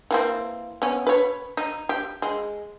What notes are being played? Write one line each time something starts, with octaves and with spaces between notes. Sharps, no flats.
E3 A#3 C4
B3 C#4
B4 C#5
D#4
G4
G#3